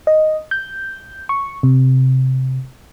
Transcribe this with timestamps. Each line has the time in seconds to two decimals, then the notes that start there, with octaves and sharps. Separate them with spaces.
0.07 D#5
0.51 G6
1.29 C#6
1.63 C3